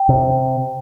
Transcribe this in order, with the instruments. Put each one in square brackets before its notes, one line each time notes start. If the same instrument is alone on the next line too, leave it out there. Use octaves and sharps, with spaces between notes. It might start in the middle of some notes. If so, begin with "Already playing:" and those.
Already playing: [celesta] G5
[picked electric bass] C3